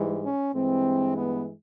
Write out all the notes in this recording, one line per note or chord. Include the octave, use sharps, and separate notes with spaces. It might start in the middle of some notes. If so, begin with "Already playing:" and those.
Already playing: G#2 E3 G3
C#4
G2 E3 G#3 C4
B3